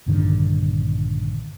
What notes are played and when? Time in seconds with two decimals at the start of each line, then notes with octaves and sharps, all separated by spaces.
0.06 A#1 G2 D3 D#3